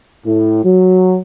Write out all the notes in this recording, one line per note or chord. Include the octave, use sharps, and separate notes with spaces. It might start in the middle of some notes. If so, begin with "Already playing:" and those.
A2
F#3